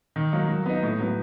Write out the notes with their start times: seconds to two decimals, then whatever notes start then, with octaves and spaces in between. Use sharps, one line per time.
0.16 D#3
0.32 F#3 A#3 D#4
0.49 F#3
0.66 B3 D#4
0.83 A2
0.99 F#3 B3